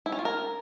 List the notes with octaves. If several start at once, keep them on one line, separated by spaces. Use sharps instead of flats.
E4
C#4
F4
A#4